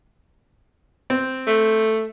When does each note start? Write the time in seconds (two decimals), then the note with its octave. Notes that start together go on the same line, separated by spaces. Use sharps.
1.10 C4
1.47 A3